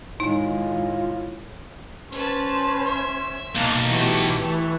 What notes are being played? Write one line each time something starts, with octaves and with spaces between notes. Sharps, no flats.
A2 D#3 G#3 D#4 F4
C#4 B4 C5 A5
E5
B1 A#3 F5 A5
E3 A3 F#4 G4
E3 A3